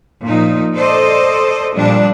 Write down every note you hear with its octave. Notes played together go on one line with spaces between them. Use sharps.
A#2 F3 D#4
A4 C5 D5 D#5
A#2 F3 G3 D4